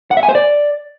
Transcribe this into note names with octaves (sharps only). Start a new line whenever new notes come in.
F#5
E5
G#5
C5
D5